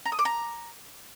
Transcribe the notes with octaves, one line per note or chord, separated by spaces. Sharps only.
A#5
D#6
D6
A#5